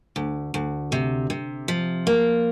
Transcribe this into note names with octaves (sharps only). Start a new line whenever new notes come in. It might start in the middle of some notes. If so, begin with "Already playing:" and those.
D2
D2
C3
C3
F3
A#3